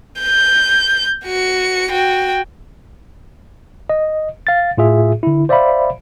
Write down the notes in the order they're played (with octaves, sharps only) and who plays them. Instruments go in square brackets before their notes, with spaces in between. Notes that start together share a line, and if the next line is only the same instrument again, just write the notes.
[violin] G6
F#4 C#7
F#4 G5
[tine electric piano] D#5
F5 A6
A2 F4 G#4 E5
D3 E4
C5 D5 E5 F5 B5